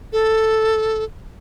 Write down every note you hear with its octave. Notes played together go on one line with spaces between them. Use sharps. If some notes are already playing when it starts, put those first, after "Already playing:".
A4